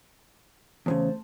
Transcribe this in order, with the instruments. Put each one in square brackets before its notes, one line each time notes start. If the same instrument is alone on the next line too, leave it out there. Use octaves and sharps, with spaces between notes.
[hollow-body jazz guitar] E2 A2 C#3 [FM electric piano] A3 C5 A5